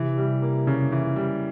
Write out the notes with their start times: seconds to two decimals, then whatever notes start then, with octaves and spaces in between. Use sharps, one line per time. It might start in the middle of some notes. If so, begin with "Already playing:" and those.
Already playing: C3 E3
0.18 G3
0.42 A#3
0.67 C#3
0.92 E3
1.16 G3